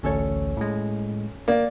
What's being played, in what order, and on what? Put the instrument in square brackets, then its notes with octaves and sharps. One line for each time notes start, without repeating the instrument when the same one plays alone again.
[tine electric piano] A1 D2 [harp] C#4 A4 C#5
[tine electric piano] A2 G#3
[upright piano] A#3 [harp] D5